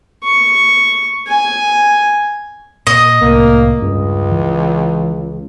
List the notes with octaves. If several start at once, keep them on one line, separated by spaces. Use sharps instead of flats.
C#6
G#5
A#2 D#5
C2 A2 A#3
C#2 G2 C#4
E3